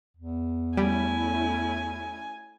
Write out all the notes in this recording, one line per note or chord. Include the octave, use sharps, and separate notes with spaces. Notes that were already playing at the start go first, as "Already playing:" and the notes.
E2
G3 A3 C#4 E4 G#5